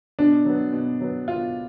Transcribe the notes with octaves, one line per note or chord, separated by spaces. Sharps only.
B2 D4
F#3 B3
B2
F#3 B3
B2 F4